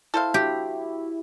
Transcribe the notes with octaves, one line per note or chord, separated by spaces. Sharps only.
E4 A4 C5 F5
F#4 G4 E5